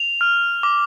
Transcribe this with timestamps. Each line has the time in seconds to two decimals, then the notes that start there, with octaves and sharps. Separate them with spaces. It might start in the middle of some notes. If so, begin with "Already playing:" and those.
Already playing: F7
0.21 F6
0.63 D6